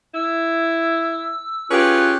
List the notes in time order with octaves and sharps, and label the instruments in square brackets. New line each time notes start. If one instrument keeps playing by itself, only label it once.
[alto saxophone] E4 [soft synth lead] E6
[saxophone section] C#4 G4 G#4 [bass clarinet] F4 [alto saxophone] B4 [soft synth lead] F#6